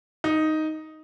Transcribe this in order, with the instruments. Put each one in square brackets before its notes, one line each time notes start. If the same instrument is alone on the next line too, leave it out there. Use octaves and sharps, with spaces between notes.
[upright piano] D#4